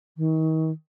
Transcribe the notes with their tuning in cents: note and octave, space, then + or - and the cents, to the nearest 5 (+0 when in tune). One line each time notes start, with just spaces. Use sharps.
D#3 +35